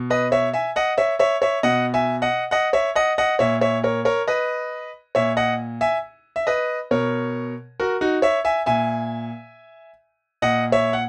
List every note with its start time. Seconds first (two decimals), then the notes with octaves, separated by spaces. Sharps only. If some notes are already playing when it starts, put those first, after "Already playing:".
Already playing: B2
0.10 B4 D#5
0.32 C#5 E5
0.53 E5 G#5
0.76 D#5 F#5
0.98 C#5 E5
1.19 C#5 E5
1.42 C#5 E5
1.63 B2 D#5 F#5
1.94 E5 G#5
2.22 D#5 F#5
2.51 D#5 F#5
2.73 C#5 E5
2.95 D#5 F#5
3.18 D#5 F#5
3.39 A#2 C#5 E5
3.61 C#5 E5
3.84 A#4 C#5
4.05 A#4 C#5
4.28 B4 D#5
5.15 A#2 C#5 E5
5.37 D#5 F#5
5.81 E5 G#5
6.36 E5
6.47 B4 D#5
6.91 B2 A#4 C#5
7.80 F#4 A#4
8.01 D#4 F#4
8.22 C#5 E5
8.45 E5 G#5
8.66 A#2 E5 G#5
10.42 A#2 D#5 F#5
10.72 C#5 E5
10.93 F#5